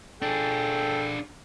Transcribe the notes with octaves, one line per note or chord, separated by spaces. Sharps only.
D4 G#4 A4 G5